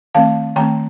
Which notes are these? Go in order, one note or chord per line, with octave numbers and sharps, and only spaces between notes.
D#3 A3 C4 F5 A5
D#3 A3 C4 G5 A#5